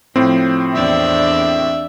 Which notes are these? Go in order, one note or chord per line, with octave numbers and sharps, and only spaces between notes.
A2 F3 C4
E2 D4 D5 E5